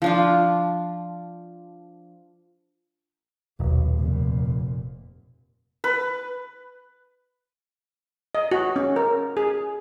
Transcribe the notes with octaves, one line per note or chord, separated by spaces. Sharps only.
F3 D4 F4
D#1 B1
F1 A#2
B4
D#5
F#4
C#4
A#4
G#4